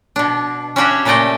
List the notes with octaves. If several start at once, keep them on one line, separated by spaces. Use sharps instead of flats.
B2 D4
C#4 D4 E4 F#4 G4 C#5
A#2 C#3 A3 D5 D#5 G5